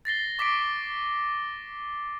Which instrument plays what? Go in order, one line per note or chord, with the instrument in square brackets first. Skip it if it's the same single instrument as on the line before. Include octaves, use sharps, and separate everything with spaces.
[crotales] A6 A#6 C7 G7
C#6 D6 B6 C7 D7